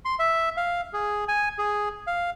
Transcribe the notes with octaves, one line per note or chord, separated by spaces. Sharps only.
C6
E5
F5
G#4
G#5
G#4
F5